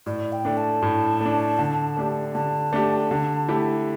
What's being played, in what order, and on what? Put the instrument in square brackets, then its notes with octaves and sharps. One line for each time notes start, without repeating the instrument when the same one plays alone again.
[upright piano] A2 [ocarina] D5
[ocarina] G5
[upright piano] A3 D4
[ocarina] A5
[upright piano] A2
A3
D4
D3
A3 D4 G4
[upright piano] D3 [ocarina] A5
[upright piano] A3 D4 G4
D3
A3 E4 G4